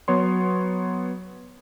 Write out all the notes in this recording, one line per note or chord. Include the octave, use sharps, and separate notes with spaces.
F#3 B3 C#5 C6